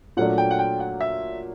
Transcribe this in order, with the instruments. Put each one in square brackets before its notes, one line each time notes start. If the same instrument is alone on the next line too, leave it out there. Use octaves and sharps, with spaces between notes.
[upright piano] A#2 F#3 A3 D4 [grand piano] F#5
[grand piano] G5
F#5
G5
F#5
E5